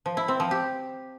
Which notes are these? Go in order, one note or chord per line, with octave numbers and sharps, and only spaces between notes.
F3
E4
C4
F3
G4